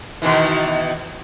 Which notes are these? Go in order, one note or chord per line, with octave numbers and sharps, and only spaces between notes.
B2 D#3 E3